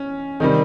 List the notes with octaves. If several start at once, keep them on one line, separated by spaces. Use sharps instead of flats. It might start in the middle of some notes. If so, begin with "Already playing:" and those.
Already playing: C#4
C3 D#3 G3 D#4